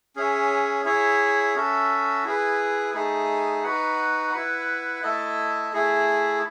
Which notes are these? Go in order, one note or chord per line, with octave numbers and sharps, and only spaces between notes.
C#4 G#4 C#5 E5
E4 G#4 C#5 E5
C#4 F#4 A4 E5
E4 G#4 B4
A3 D#4 G#4
D#4 F#4 B4 F#5
E4 B4 F#5
A3 E4 A4 D#5
A3 E4 G#4